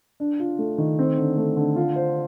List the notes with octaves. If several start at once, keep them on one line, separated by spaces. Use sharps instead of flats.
D4
F4
A3
D#3
C4
D3
A3
D3
F4
C5